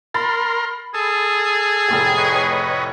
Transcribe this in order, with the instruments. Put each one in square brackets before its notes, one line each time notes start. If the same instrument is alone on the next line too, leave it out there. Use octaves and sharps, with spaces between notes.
[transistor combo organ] A#4 C6 [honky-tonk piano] B5 A6
[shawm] G#4 [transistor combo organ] A4
[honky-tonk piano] F1 A2 G4
[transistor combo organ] B4 C#5 D#5